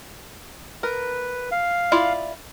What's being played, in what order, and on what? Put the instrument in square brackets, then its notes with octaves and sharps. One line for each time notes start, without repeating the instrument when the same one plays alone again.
[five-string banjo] A#4 [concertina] B4
[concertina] F5
[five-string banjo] E4 F4 D5